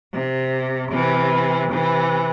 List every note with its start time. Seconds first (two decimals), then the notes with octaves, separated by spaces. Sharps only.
0.13 C3
0.92 C3 E3
1.72 C3 E3